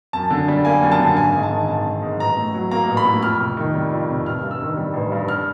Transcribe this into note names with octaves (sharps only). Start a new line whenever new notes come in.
F#2 A5
D3
G3
A#3 G#5
F#2
A5
D3
G#1 G#5
G#2
A5
D#3
G#1 A5
G#1
G#2
A1 A#5
A2
F#3
A#3 A#5
A1
B5
A2
F2 F6
C3
D#3
G3
F2
C3
A1 F6
G2
E6
D#3
G3
A1
G2
F6